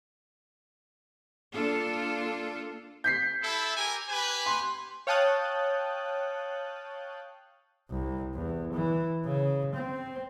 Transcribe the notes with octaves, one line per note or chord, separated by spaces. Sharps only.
A#3 D4 F4 A4
G6 B6 C7
E4 A4
G4 A#4 G#5
G4 B4 G#5
C6
C#5 F5 G5 A5 D#6 F#6
C2
E2
E3
C#3
C4